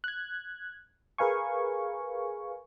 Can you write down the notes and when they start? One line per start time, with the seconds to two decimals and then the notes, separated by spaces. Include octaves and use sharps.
0.04 F#6 G#6
1.18 G#4 A#4 B4 F5 G#5 C#6